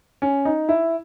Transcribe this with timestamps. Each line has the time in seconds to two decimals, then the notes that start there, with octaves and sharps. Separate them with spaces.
0.22 C#4
0.45 D#4
0.69 E4